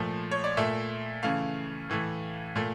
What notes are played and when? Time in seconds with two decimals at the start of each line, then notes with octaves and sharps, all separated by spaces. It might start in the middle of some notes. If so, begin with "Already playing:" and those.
Already playing: A#2 F3 A3
0.31 C#5
0.44 D5
0.57 A#2 A3 E5
1.23 C#3 E3 A3 F5
1.90 A2 E3 A3
2.56 A#2 A3